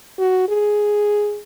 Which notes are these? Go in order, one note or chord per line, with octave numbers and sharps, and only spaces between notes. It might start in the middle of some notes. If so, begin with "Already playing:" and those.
F#4
G#4